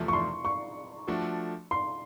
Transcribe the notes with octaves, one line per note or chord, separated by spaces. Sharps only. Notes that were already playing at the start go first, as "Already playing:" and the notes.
Already playing: E2 C3 F3 A3
C#6
C6
C#6
F3 A3 D4 F#4 A4
C6